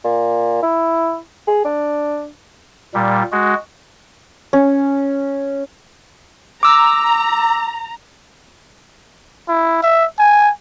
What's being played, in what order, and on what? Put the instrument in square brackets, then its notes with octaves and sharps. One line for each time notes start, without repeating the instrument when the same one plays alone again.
[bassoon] A#2
E4
G#4
D4
[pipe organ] A#2 G3
G#3 F#4
[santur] C#4
[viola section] A#5 [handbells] D6 E6
[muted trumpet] E4
E5
G#5